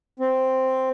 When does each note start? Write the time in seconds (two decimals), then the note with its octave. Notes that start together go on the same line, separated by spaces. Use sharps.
0.19 C4